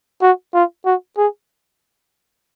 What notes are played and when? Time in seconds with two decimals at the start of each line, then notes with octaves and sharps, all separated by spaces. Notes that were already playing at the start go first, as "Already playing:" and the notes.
0.22 F#4
0.54 F4
0.85 F#4
1.17 G#4